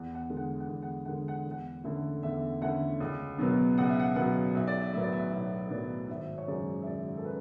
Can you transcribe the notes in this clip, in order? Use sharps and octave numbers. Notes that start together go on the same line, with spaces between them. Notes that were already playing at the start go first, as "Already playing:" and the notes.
Already playing: E2 F#5
F#5
D3 G#3
F#5
F#5
E2
F#5
D3 G#3 F#5
F#5
E2
F#5
D3 A3 C#4 E4
E2 E5
D3 A3 C#4 E4 F#5
C#2
B2 F#3 B3
C#2 F#5
E5
F#5
B2 F#3 B3 F#5
B1 E5
D5
E5
A2 F#3 B3 E5
D5
E5
B1 E5
A2 F#3 B3 D5
G#1 E5
C#5
F#2 C#3 G#3 C#4 D5
E5
G#1 D5
A4
C#4 B4